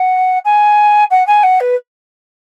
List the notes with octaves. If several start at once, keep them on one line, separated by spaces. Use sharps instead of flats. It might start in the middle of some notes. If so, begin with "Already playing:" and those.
Already playing: F#5
G#5
F#5
G#5
F#5
B4